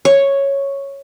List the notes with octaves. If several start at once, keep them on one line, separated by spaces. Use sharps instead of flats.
C#5